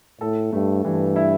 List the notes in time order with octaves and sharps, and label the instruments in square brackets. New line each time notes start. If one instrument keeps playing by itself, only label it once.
[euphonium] A2 [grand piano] A4
[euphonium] G2 [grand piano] A3
[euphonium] G2 [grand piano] E3
[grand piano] E4